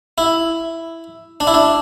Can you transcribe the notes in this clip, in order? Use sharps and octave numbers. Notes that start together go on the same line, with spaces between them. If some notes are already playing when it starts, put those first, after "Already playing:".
E4
D4
E4
D4